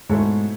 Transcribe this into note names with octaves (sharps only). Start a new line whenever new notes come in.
G#2 B2 A3 E4 A4 C#5